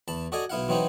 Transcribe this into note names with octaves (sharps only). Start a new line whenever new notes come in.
E2 A5 B5
F#4 A4 D5 D#5 G#5 A#5
B1 B3 E4 F5 F#5
E3 F#3 C4 D#4 F#4 B4